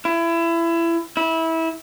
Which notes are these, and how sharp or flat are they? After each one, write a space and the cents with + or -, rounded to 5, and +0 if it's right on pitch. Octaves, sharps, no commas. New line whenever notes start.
E4 +25
E4 -20